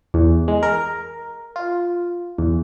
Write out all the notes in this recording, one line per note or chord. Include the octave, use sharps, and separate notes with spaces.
E2
G#3
A#4
F4
E2